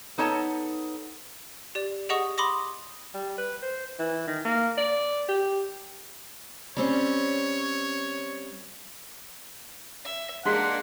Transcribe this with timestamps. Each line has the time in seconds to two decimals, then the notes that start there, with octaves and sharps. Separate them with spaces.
0.18 B3 D#4 A4 C#5 A5
1.75 G4 D5
2.09 G4 G#4 D#5 F#5 C#6 D#6
2.38 B5 C6 D6 D#6 A#6
3.14 G3
3.38 B4
3.62 C5
3.99 E3
4.27 D#3
4.45 A#3
4.78 D5
5.29 G4
6.77 G3 C4 C#4 C#5
10.05 E5
10.45 G#3 A#3 D4 F#5 C6 B6